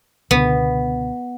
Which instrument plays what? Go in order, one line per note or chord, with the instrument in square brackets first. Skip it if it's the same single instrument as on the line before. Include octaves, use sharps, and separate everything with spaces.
[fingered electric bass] C#2 B2 D3 [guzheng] B3